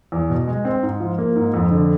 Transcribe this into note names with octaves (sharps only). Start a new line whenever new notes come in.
E2
B2
G#3
C4
G#2
F3
A#3
G#2
F2
D3